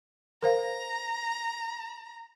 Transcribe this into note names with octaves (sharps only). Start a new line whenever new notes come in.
A#4 C5 F5 A#5